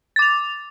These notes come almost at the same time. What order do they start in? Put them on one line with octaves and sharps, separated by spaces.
A6 D6 F7